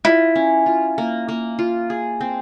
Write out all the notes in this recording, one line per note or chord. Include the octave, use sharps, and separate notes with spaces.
E4 F4
C#4
F4
A#3
A#3
F4
G#4
C4